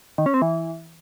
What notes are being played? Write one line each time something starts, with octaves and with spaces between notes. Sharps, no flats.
D#3
C#4
C4
E3